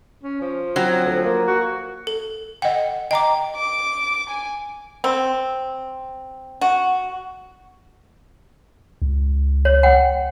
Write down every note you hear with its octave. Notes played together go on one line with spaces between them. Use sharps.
C#4
F3
F#3 C4
D2
A#3
F#4
A4
D#5 F#5 G5
D#5 G5 A#5 D6
D6
G#5
C4
F#4
C#2
C#5
F#5 G5